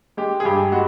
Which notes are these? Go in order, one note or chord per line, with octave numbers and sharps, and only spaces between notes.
G#3 G4
G#4
G2 G4
G#3 F#4